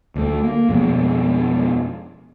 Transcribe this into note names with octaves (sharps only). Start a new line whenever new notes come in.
D2 A3
A#3
F2 B2 G#3